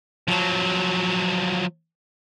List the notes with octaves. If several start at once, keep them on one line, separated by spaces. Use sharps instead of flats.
F3 F#3